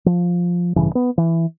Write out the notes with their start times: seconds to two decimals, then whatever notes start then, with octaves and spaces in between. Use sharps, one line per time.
0.06 F3
0.76 A1 G2 C#3 E3
0.95 B3
1.18 E3